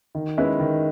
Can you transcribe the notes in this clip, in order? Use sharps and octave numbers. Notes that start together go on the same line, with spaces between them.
D#3
G#3 C#4 E4 B4
D#3